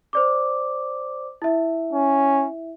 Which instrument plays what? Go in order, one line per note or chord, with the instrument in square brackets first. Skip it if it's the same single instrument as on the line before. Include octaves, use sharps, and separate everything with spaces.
[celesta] C5 D5 D6
E4 E5
[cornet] C#4